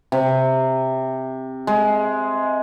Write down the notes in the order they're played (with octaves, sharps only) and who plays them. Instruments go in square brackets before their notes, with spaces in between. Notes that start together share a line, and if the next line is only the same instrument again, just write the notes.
[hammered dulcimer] C3
G#3